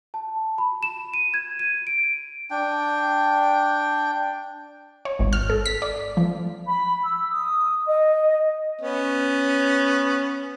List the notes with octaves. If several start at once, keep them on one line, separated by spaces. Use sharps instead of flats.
A5
B5
E7
D#7
G#6
D#7
D7
D4 G5
C#5
G#1
F6
A4
B6
D5
F3
B5
E6
D#6
D#5
B3 C#4